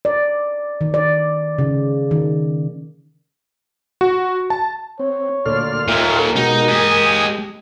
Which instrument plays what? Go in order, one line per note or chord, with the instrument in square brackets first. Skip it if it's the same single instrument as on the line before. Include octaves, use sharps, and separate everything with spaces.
[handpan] D5
D#3
D5
C#3
D#3
[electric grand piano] F#4
A5
[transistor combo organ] C4 [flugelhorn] C#5
[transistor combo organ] D2 A#2 D5 [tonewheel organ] A4 C6 F6
[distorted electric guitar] D#2 A#2 [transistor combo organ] F4 E5 G5 [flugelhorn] A#4
[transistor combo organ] B2 F#4 G4 [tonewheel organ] G#3 [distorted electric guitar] D#4
[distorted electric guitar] G4 D#5 [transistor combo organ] G#5 D#6